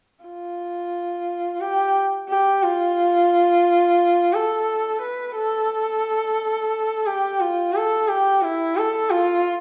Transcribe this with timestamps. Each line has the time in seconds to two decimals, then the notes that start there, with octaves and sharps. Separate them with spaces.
0.24 F4
1.60 G4
2.29 G4
2.63 F4
4.33 A4
5.01 B4
5.35 A4
7.06 G4
7.40 F4
7.74 A4
8.08 G4
8.42 E4
8.76 A4
9.10 F4